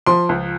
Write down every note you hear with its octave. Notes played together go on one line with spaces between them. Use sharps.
F3 C6
C#2